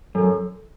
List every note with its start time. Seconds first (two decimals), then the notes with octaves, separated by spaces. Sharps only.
0.15 F#2 A4